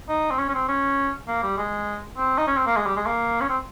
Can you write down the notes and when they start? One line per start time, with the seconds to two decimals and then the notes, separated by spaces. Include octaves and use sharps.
0.09 D#4
0.31 C4
0.39 C#4
0.49 C#4
0.54 C4
0.68 C#4
1.28 A#3
1.43 G3
1.58 G#3
2.17 C4
2.38 D#4
2.48 C#4
2.57 C4
2.67 A#3
2.76 G#3
2.86 G3
2.96 G#3
3.06 A#3
3.41 C#4
3.49 C4